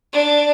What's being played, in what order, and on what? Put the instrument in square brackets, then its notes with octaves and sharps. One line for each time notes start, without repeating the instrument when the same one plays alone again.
[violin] D4